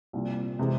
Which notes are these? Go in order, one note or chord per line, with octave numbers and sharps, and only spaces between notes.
C2 A#2 F3
C3 E3 G#3